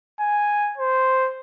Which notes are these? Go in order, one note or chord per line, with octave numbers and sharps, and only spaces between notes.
G#5
C5